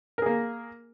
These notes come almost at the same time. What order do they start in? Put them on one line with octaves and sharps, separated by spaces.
A#4 G#4 A#3